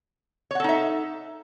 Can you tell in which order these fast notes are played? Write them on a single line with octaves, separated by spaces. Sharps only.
C#5 F#5 A4 D#4 E5